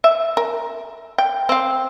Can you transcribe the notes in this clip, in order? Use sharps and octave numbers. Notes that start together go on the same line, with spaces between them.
E5
A#4
G5
C4 F5